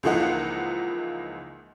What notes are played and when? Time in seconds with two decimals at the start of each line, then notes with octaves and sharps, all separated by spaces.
0.03 C#2 E3 F3 A#3 D#4 F#5